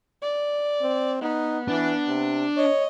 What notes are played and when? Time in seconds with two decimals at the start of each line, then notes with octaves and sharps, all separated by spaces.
0.22 D5
0.82 C4
1.22 B3 D#4
1.68 E3 D4
2.07 C3
2.57 C#5 D#5